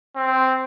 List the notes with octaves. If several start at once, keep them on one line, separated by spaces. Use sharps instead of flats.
C4